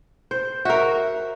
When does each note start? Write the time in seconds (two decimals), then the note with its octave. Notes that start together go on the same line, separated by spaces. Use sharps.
0.31 C5
0.65 F#4 A#4 E5